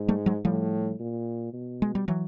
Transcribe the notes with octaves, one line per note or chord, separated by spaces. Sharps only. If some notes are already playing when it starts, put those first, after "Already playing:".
Already playing: G#2
G3 A3
F#3 G#3
A2 F3 G3
A#2
B2
G#3
G3
E3 F#3